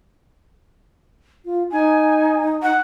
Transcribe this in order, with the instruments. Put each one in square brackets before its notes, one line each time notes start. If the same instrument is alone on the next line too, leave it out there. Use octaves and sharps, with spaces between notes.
[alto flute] F4
[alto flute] D#4 [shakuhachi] G#5
[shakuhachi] F#5